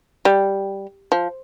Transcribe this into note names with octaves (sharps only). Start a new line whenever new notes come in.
G3
F3